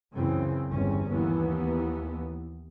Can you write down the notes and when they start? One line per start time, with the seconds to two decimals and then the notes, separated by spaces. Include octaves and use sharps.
0.13 C#2 F#2 C#3 E3 C4
0.69 G1 E2 C4 C#4
1.12 D#2 E3 B3